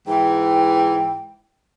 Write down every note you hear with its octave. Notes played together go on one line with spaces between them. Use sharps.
G#2 E3 G5